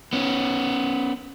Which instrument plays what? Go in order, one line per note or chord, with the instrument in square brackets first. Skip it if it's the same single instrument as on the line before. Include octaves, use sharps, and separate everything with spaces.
[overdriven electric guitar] B3 C#4